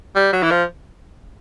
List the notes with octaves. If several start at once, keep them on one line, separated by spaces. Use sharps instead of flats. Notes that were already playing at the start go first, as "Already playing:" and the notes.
G3
F#3
E3
F3